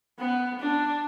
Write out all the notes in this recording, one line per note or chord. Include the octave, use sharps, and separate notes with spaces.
B3
D4